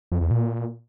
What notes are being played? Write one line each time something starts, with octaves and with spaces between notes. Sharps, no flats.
F2
E2
A#2